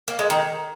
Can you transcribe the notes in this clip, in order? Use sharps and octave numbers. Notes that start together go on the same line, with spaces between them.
A#3
G#3
D#3